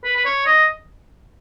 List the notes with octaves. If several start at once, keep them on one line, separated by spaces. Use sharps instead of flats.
B4
B4
C#5
D#5